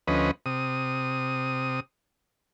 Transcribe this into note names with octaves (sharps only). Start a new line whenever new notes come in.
D2 F3 C#4 B4 D#5
C3 D#6